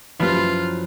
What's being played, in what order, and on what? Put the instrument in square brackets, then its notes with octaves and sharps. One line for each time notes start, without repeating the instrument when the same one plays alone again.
[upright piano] F#2 B4 C5 [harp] F3 E4 [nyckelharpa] F4